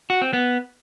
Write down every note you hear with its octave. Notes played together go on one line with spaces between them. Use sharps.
F#4
C4
B3